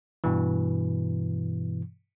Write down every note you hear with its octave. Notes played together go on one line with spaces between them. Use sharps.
G2 B2 E3